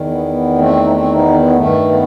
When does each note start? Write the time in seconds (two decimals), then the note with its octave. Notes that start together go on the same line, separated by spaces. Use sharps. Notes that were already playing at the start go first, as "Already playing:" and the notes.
Already playing: E2 D#3
0.09 B3
0.26 B3
0.58 A3 C4
0.84 D#4
0.90 A3 C4
1.12 B3 D#4
1.35 B3
1.56 G2 D#3 A3
1.89 B3